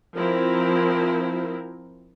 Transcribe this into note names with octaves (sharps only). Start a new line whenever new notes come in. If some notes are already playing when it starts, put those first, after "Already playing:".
F3 C4 E4 A#4